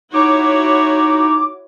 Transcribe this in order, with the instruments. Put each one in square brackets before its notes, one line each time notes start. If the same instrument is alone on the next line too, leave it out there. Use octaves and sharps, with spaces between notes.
[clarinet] D#4 [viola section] E4 F#4 C#5 [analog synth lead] D6